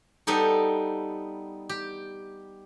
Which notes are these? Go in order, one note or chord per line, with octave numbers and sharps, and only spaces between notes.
G3 B3 D#4 G4 A4
G4